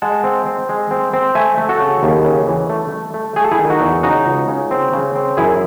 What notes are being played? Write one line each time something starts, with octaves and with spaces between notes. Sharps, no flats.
G#3 F#5 A5
C4
C4
G#3
C4
C4
A3 E5 G#5
A3
F#4 A4
C#3
D#2
C#3
E3
A3
A3
A3
A3 G#4
A4
E4 G#4
D#3
D#4 F#4
E2
C#3 D#4 F#4
C#2
C#3
C4
C#3
C4
F#2 E4 G#4